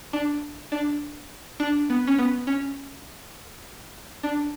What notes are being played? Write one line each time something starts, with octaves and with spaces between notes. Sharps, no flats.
D4
D4
D4
B3
C#4
B3
C#4
D4